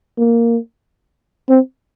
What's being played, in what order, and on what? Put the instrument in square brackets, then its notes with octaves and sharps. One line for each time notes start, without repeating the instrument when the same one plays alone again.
[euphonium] A#3
C4